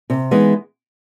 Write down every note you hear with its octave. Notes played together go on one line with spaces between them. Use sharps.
C3
E3 G#3 B3 D#4